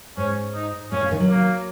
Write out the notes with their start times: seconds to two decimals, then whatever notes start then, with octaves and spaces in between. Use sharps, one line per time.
0.17 G#2 C#4
0.54 D#4
0.92 A#2 C#4
1.01 C#3
1.11 D#3
1.20 F#3
1.30 A#3